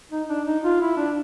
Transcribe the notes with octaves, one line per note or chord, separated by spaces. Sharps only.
D#4
D4
D#4
F4
E4
D4